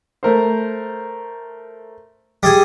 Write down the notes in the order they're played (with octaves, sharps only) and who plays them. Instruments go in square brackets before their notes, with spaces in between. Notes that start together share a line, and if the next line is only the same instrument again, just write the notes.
[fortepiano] A3 A#4 C5
[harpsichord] G3 G#4 G#5